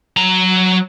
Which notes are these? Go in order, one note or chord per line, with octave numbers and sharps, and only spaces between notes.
F#3 A#5